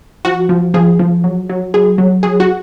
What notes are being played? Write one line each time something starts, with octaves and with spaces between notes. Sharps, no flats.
F3 F#4
F3
F3 G#4
F3
F#3
F#3
F#3 G#4
F#3
F#3 G#4
F#4